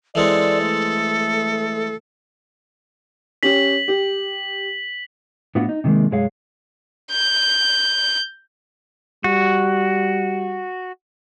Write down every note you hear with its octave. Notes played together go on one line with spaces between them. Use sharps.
E3 G#3 C4 A4 D5
A3
C#4 G4 B6 F#7
G4
A2 B3 D4 F4 F#4
D#4
C3 D#3 F3 G#3 A#3
B1 F#2 G#3 G#4 C#5 F5
G6
G3 F#4